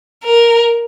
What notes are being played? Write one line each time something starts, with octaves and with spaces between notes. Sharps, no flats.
A#4